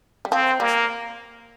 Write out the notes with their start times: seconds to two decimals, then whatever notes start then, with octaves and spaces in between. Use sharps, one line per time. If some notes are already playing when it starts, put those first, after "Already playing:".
0.25 G3
0.31 F3 C4
0.60 G3 A#3